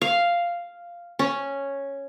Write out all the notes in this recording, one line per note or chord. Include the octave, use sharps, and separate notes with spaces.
F5
C#4